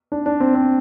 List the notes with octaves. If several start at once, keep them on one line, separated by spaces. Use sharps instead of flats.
D4
D4
C4
C4